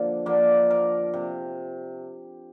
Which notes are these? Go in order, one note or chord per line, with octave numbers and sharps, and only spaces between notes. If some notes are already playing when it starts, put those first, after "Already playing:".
Already playing: D3 F3 A#3
D3 F3 A#3 D5
A#4
C3